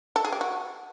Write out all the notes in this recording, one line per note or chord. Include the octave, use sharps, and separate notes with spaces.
A4
G#4
G4
F#4